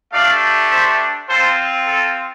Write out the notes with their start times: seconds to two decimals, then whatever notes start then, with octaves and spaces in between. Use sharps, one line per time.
0.11 A3 D4 G4 D5 F5
0.70 C5 E5
1.28 C4 F4 A4 C5
1.87 A4